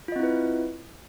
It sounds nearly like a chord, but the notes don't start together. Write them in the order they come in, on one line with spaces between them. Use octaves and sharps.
F4 D#5 C4 E4 B4